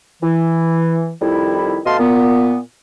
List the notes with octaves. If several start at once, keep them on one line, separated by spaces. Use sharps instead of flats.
E3
F2 D#3 G3 E4
B2 A3 D#5 F5 A5 C6
A#2 B3